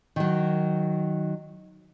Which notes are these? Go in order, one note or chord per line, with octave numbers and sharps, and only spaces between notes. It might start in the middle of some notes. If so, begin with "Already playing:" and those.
D#3 F#3